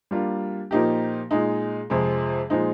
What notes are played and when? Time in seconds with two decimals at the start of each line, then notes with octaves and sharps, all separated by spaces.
0.11 G3 A#3 D4 F4
0.71 A#2 F3 A#3 D#4 G4
1.31 A#2 G#3 D#4
1.90 F2 C3 F3 G#3
2.50 A#2 F3 G#3 D#4